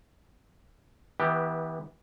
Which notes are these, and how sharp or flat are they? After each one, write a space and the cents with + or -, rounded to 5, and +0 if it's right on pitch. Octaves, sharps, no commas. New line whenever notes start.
E3 -30 B3 -10 G4 +0